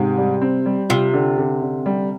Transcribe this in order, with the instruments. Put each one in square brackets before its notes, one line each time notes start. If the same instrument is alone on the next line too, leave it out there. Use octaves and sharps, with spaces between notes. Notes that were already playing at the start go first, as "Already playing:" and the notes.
Already playing: [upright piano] G#2 [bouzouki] C3
[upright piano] G3
C4
G3
[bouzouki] C3 [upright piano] F4
[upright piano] D3
D3
D3
G3